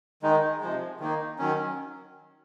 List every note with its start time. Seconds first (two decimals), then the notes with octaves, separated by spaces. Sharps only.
0.22 D#3 G#3 D#4
0.61 C3 F3 G#3
1.00 D#3 A#3 D#4
1.39 D#3 F#3 C#4